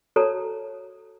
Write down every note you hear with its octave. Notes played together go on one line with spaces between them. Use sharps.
F#4 A4 C#5 D5 A5 A#5